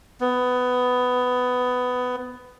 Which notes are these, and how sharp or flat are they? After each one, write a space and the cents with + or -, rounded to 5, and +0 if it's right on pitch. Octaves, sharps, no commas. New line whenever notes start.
B3 +15